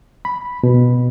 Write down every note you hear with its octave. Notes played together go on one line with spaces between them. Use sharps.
B5
B2